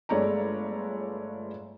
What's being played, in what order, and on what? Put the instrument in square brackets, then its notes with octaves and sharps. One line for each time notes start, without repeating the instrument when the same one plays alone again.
[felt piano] G1 G#3 A3 C#5 D5 A#5